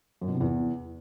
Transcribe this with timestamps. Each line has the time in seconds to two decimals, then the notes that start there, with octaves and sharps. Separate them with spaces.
0.21 F#2
0.28 B2
0.34 C3
0.41 E2